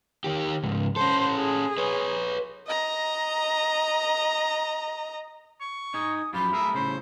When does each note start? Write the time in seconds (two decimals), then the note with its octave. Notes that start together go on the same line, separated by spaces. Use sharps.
0.24 D#3 G4
0.63 C#2 G#2
0.96 C#4 A4 C5
1.36 G#4
1.78 B4 C#5
2.67 D#5 A#5
5.61 C#6
5.94 D#4 G#5 D#6
6.34 F#2 F3 F4 G4 B5
6.53 A3 G#4 A#4 E5
6.75 A2 C#3 C5